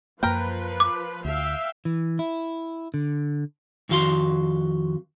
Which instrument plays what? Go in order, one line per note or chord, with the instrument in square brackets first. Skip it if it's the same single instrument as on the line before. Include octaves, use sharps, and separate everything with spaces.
[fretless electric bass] F#2 A#3 [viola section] F3 B4 [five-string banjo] A#4 G5
[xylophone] D6
[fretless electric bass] D2 [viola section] E5 F5 G5
[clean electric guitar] E3
E4
D3
F2 D#3 F#4 F5 C6